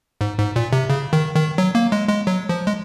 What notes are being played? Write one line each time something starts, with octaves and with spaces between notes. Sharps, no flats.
G#2
G#2
A#2
C3
C#3
D#3
D#3
F#3
A#3
G#3
G#3
F#3
F3
G#3